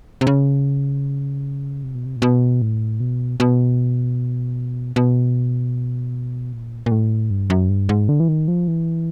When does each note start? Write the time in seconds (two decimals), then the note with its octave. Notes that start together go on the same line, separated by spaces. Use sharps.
0.21 C3
0.27 C#3
1.83 C3
1.95 B2
2.06 C3
2.16 A#2
2.22 B2
2.62 A2
3.00 B2
3.40 B2
4.96 B2
6.53 A#2
6.86 A#2
6.91 A2
7.31 G2
7.50 F#2
7.69 G2
7.89 G#2
8.09 D3
8.20 E3
8.28 D#3
8.48 F3
8.68 E3